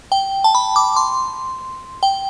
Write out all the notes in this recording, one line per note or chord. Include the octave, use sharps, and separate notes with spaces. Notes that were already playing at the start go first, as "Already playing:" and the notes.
G5
A5
B5
D6
C6
G5